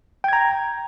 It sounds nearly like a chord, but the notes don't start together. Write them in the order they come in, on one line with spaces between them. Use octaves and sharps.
G5 G#6 A#5